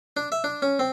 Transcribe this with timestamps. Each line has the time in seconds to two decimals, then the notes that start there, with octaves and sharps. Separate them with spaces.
0.17 D4
0.32 E5
0.44 D4
0.62 C#4
0.79 C4